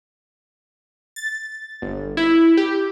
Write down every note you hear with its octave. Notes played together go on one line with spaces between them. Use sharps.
A6
G1
E4
G4